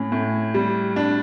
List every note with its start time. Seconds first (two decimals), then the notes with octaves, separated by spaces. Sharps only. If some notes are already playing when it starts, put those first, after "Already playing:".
Already playing: A2 C#4
0.12 A2
0.54 G3
0.96 D4